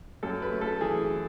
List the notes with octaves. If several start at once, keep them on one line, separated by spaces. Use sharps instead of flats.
F#2 A4
B4
A3
A4
E3 G#4